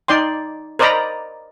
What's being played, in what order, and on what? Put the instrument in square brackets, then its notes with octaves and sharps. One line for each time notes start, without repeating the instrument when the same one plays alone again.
[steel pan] D#4 D5 G5 C6
A#4 C5 D5 D#5 A#5 B5